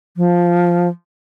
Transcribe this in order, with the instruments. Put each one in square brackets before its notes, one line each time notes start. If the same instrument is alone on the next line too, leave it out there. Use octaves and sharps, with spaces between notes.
[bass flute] F3